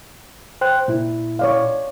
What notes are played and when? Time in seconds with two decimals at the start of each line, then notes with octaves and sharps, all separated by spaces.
0.61 C5 G5 F#6
0.88 A#2 E4
1.39 C#5 D5 F5